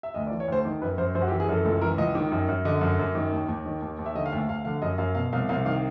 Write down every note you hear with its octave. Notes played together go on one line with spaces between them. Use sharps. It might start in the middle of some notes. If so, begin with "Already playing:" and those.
E5
D2 D#5
D5
E3
C#5
D2 C5
D#3
F#2 B4
F#2 C5
F#2 C5
F#4
G4
E3
G#4
F#2 A4
C#2 A4
E3 A#4
C#2 D#5
D#3
F#2
F#2
D3 D#5
F#2
F#2
D#3
D#2
D#2
D#3
D#2
D#2
E5
D3 D#5
F5
D2 E5
D2 F5
D3 F5
F#2 D#5
F#2 F5
B2 F5
C2 F5
C2 F5
D#3 F5